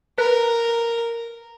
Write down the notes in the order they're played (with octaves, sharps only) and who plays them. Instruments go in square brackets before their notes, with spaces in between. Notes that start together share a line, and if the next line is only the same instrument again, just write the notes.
[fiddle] A#4 [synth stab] B4